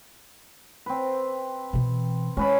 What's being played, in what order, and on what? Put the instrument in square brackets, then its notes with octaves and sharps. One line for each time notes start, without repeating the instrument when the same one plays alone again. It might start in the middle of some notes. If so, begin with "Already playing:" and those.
[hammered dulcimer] C4 B4
[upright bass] B2 E3
[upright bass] G#3 [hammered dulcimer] C#4 B4 B5